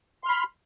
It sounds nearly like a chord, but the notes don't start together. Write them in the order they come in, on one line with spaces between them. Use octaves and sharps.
C6 F6 B5